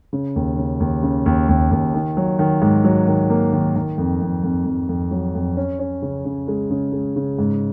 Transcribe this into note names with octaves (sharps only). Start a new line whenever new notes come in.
C#3
D#2
C#3
D#2
C#3
D#2
D#2
D#2
D#3
F#3
D#3
G#2
F#3
D#3
A#3
D#3
D#3
F2
F2
F2
F2
F2
F#3
F2
C#4
C#4
C#3
C#3
G#3
C#3
G#3
C#3
G#2